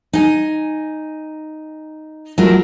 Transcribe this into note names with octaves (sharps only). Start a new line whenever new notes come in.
D#4 G#5
F#3 A3 E4 F4 A#4